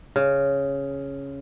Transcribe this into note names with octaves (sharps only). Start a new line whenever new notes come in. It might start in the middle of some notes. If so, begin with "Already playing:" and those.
C#3